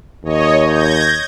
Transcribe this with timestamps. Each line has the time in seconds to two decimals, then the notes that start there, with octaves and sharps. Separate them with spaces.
0.25 D#2 C#5 D#5
0.67 G6 G#6 A#6